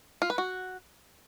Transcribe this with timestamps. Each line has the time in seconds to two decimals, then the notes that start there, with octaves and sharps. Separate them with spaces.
0.22 F4
0.30 B4
0.38 F#4